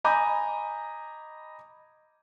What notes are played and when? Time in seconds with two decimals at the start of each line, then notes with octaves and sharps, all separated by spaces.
0.04 D#5 G#5 A#5 B5 D6 G6